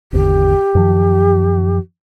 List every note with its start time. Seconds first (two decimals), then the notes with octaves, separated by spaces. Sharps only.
0.13 G#1 E2 D3 G4
0.75 F#2 D#3 F3